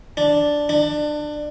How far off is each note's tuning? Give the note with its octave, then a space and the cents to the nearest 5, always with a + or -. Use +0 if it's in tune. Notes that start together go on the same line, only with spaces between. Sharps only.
D4 +0
D4 +25